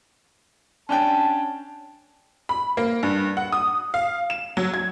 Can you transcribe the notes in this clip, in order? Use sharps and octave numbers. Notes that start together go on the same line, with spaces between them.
C#4 D4 G5 A5
B5
A#3
G2
F#5
D#6
F5
E7
F#3
G#6